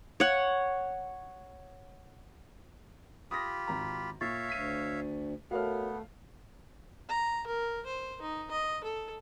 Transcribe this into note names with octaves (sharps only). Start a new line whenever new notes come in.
C#5 F#5
F4 G4 B5 D#6 A#6
G#1 A#5
A#2 C#5 E5 F5 C#6 A6
D2 B6 D#7
A3 B3 F#4 A#4 C#5 F5 F6
A#5
A#4
C5
D#4
D#5
A4